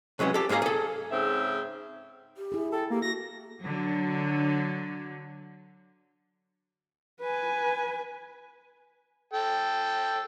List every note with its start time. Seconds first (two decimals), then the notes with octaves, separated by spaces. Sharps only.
0.19 C3 F#3 G#3 B3 C#4
0.34 G4 A4
0.49 G#2 A#3 G#4 F5 A#5
0.62 G#4 A4
1.10 G#2 C#3 C4 E5
2.37 G4
2.52 E4 G#4
2.72 A4 G5
2.90 A#3 G4
3.02 F#4 A#6
3.61 D3 F#3
7.21 B4 G#5
9.33 A4 G5